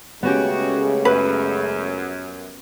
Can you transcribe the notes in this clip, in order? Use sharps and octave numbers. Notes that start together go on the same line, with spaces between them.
C#3 G#3 A3 B3 C#4 F#4 G4
F#2 B4